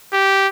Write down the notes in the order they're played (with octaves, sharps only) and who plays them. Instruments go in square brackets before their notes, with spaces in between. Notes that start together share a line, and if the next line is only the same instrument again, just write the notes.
[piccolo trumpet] G4